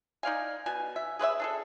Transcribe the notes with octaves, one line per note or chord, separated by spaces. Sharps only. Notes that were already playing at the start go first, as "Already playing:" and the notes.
D#4 D5 F5 G#5
B2 G#5
E5
G#4 B4 C#5 E5
D4 G#4 A4